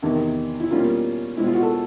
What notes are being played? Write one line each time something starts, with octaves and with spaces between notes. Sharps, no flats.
E2 C3 D#3
E4
B2 G3 A#3 C#4 F4
B2 G#3 C4 E4
F4
F#4
A4